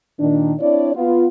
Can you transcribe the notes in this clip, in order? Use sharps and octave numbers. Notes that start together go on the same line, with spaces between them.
A#2 D#3 D4
C4 D4 E4 C#5 D5
B3 F4